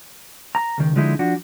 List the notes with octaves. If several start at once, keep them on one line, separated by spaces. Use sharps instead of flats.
A#5
C#2 D#3
D3 F3 G#3 D#4 E4
F3 D4 F#4